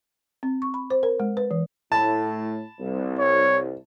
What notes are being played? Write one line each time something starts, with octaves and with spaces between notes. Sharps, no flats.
C4
C#6
B5
C5
A#4
G#3
B4
E3
A2 A5 B5
C2
C#5